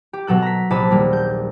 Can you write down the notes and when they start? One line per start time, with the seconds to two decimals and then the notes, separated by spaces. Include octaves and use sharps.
0.13 G4
0.27 B2 F#3 A4 F#6
0.42 A#5 B6
0.70 A#1 C3 A5 B5 B6 D#7
0.90 D#2 G3 A#3
1.13 G6